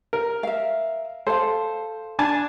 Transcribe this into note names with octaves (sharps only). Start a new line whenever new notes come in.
A#4
E5 F5
A4 C5 F5
D4 G#5 A5